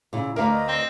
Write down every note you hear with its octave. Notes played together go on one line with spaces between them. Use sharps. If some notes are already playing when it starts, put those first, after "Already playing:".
A#2 C#3 E4
D2 D4 A#4 B4 D5 F5 A#5
D#5
C4